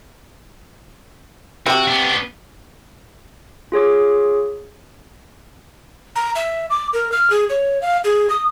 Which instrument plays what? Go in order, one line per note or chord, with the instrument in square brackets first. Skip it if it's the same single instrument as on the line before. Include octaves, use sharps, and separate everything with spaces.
[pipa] C3 G4 [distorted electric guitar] F#4
[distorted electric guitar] B3 D4
[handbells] F4 G#4 C#5 D6
[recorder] A#5
E5
D6
A#4
F6
G#4
C#5
F5
G#4
D#6